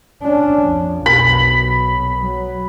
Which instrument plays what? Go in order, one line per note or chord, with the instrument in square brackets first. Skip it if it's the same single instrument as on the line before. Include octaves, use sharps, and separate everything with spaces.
[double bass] C#4 D4
F2
[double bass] B1 B2 [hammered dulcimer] B5
[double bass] F#3